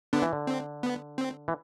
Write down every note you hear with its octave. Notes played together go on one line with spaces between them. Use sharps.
D3 B3 D4
E3
D3
C4
B3
C4
E3